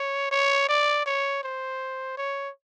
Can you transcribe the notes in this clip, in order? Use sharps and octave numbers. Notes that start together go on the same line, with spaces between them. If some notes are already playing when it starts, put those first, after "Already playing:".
Already playing: C#5
C#5
D5
C#5
C5
C#5